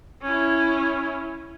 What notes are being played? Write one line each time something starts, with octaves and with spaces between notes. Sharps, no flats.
C#4 E4